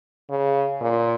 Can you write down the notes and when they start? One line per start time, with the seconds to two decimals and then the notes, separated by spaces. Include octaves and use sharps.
0.30 C#3
0.81 A#2